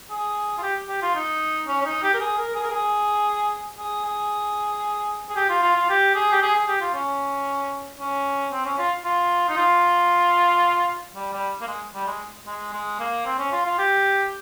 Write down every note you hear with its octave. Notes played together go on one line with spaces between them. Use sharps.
G#4
F4
G4
G4
F4
D#4
C#4
C#4
D#4
G4
A#4
G#4
A#4
G#4
A#4
G#4
G#4
G#4
G#4
G4
F4
F4
F4
G4
G#4
G4
G#4
G#4
G4
F4
C#4
C#4
C4
C#4
F4
F4
D#4
F4
G3
G3
A#3
G#3
G3
G#3
G#3
G#3
A#3
C4
C#4
F4
F4
G4